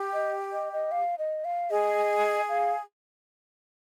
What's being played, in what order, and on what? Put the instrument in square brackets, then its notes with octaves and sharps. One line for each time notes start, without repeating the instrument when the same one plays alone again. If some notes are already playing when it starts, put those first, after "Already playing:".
Already playing: [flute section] G4
[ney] D#5
D#5
D#5
F5
D#5
F5
[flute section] G#4 [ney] D#5
[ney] F5